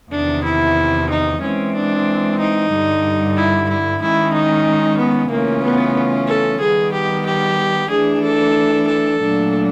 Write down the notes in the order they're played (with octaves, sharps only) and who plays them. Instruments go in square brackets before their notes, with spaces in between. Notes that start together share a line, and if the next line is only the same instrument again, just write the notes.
[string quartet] E2 C3 D#3 [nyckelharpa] D4
[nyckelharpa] E4
D#4
[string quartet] E3 G#3 C4 [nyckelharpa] C#4
[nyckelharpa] D4
D#4
[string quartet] G2 D3 G3
[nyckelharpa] E4
E4
[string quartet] D#3 G#3 C#4 [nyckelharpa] E4
[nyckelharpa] D#4
B3
[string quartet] C#3 E3 A3 C#4 F4 [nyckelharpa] A#3
[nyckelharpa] B3
A4
[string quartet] D#3 G3 B3 [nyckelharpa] G#4
[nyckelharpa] G4
G4
[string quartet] E3 A3 D4 [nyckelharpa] G#4
[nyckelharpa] A4
A4
[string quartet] A#2 F#3 A3 D4